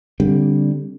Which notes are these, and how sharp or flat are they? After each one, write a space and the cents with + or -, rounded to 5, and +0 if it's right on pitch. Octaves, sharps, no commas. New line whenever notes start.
D3 -10 G3 +0 C4 +0